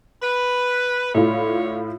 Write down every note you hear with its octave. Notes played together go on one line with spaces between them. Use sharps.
B4
A2 D3 E4 F4 C#5